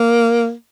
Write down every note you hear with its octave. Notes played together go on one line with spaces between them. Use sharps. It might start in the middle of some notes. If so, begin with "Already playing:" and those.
Already playing: A#3